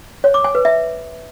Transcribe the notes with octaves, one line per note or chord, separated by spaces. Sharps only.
C#5
D6
G#5
B4
E5